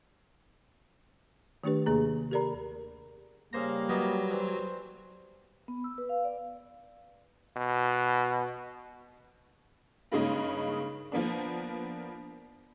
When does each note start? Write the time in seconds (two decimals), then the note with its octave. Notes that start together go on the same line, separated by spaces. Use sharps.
1.64 D#3 A3 D4 G4 B4
1.86 D#2 C3 A#3 G#4 A#5
2.31 G4 A4 A#4 D5 A#5 B5
3.53 C#3 G3 A#3 C5 A#5
3.89 F#3 B3 D#4
4.31 E3 C5
5.68 B3
5.84 E6
5.98 B4
6.09 F5
6.25 D5
7.57 B2
10.12 G2 C#3 G#3 A#3 C#4 D#4
11.12 F3 A#3 B3 D4